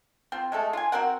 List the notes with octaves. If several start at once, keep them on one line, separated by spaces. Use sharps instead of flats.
C4 F4
G#3 A3 A4
F4 G#5
C4 F#4 A#4 F#5